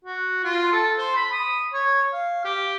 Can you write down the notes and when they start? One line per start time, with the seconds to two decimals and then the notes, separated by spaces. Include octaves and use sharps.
0.05 F#4
0.44 F4
0.72 A4
0.98 C5
1.16 B5
1.32 D#6
1.73 C#5
2.13 F5
2.45 G4